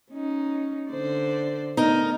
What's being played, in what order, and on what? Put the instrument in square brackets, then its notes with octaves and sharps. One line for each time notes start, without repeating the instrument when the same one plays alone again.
[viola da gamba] C#4 D#4
D3 C5 D5
[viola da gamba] A3 B3 [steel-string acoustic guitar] D#4 A#4